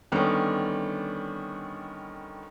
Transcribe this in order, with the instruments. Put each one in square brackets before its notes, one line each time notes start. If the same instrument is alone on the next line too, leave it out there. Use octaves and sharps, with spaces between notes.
[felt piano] D3 D#3 G3 B3 C#4